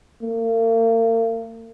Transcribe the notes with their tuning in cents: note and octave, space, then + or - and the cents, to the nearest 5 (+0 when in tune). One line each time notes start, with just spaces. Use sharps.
A#3 -40